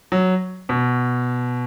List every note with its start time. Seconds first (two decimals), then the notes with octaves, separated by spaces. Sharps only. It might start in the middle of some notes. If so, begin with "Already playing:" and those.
0.12 F#3
0.69 B2